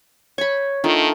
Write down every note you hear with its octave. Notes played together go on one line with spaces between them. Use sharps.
C#5 B5 C#6 G#6
D#3 A3 D4 D#4 F4